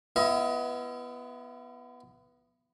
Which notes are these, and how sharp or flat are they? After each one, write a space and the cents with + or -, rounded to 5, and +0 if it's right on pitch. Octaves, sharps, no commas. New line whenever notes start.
B3 +0 E4 +40 D#5 +30